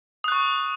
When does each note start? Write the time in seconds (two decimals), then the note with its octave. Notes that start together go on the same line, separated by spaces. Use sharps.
0.24 D#6
0.28 F#6
0.32 C#6